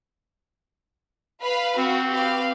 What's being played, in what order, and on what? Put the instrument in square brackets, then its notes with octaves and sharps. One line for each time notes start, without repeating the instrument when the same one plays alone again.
[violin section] B4 F5
[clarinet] C4 [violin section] F#4
[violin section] G4 B4 F5